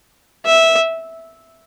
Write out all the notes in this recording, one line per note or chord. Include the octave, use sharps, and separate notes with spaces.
E5